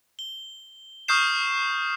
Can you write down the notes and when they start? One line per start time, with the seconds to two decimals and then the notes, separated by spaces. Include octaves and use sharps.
0.19 G7
1.08 C#6 D#6 F6 G6 C7 E7